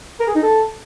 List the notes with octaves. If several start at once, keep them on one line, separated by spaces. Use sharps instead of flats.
A#4
G#4
D#4
A4